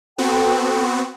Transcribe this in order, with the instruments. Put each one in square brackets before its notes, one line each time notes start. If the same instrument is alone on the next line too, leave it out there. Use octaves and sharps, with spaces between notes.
[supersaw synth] B3 C4 F#4 [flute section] A4 G5